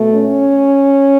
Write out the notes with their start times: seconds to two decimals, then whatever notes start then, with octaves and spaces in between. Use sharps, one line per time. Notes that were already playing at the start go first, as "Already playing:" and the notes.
Already playing: B2 A3
0.15 C#4